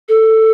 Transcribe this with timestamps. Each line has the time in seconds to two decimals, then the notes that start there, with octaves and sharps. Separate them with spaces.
0.09 A4